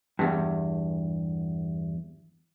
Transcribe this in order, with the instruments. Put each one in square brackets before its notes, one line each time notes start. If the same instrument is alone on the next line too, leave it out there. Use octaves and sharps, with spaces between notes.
[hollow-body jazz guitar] E2 G2